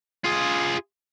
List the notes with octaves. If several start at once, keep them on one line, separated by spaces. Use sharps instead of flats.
F4 G#4